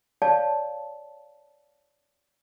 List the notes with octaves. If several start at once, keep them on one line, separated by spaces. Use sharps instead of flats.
C#5 D5 F5 A5